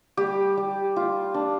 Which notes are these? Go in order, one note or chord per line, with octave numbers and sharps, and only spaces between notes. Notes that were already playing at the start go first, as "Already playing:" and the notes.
G3 G4
G3
F4
D4